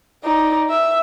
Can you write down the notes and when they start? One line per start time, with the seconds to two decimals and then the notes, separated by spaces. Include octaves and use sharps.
0.24 D#4 D5
0.70 E5